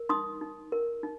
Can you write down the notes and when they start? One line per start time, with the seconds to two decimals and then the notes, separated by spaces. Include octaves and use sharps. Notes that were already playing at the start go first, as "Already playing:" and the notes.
Already playing: A#4
0.09 D#4 C6 D#6
0.41 D#4
0.72 A#4
1.03 D#4